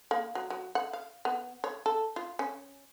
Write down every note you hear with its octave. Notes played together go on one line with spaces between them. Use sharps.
A#3
F#3
F#3
F#5
F5
B3
C#5
A4
F4
C#4